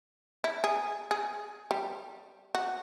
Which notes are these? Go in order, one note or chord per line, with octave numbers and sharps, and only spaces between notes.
E4
G#4
G#4
G3
F#4